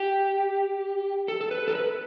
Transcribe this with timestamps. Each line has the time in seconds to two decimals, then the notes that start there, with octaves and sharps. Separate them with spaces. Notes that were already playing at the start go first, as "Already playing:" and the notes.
Already playing: G4
1.28 A4
1.41 A4
1.51 B4
1.68 A4
1.75 B4